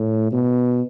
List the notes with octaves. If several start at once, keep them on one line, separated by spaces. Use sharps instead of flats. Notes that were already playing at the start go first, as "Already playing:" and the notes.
Already playing: A2
B2